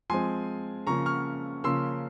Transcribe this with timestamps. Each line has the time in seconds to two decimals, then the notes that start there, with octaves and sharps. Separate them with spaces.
0.10 F3 G#3 C4 G#5 C6
0.87 C#3 F3 A#3 C#4 A#5 C#6
1.06 C#6 F6
1.64 C#3 F3 A#3 C#4 C6 E6